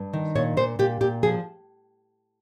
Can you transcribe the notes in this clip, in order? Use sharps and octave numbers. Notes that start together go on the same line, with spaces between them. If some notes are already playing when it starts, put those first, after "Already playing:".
Already playing: G2
D#3
A#2 C#5
A#2 C5
A#2 G4
A#2 G4
F3 G#4